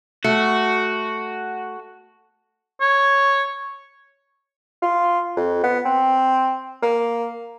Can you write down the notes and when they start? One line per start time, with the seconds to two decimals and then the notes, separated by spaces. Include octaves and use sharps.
0.24 A3 F#4
2.81 C#5
4.82 F4
5.37 F2
5.64 B3
5.85 C4
6.83 A#3